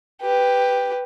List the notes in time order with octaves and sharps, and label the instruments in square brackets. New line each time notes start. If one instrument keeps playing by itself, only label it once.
[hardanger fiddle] G4 B4